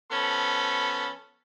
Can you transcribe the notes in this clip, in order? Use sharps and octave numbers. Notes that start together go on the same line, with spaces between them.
F3 B3 C#4 A4 B5